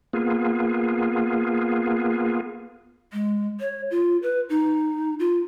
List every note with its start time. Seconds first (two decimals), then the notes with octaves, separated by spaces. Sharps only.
0.13 A#3 B3 F4 G#4
3.13 G#3
3.60 C#5
3.91 F4
4.23 B4
4.49 D#4
5.19 F4